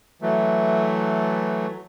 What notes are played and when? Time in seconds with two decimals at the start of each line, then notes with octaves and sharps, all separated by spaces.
0.22 E3 F#3 A3